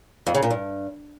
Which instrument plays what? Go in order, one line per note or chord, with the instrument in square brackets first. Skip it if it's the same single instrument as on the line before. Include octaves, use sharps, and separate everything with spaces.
[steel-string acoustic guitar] F2
C#3
A#2
G2